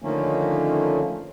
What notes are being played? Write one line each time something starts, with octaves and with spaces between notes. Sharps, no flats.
D3 D#3 F3 A3 A#3 C#4